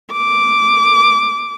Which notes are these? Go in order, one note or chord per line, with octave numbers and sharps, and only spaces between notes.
D6